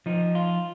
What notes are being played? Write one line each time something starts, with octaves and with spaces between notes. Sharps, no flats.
F3 D#4
F4